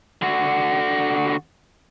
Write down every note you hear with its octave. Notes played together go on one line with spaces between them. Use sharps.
D3 F#4